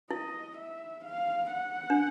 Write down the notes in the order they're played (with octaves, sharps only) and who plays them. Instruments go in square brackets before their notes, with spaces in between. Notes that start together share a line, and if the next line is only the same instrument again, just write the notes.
[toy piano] E4 [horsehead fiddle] D#5
[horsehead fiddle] E5
F5
F#5
[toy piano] D4